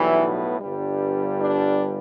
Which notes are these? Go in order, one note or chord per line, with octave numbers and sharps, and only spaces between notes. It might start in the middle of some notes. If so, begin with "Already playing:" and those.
Already playing: B1 A2 E3 G3 B3 E4
G1 G2 G3
D4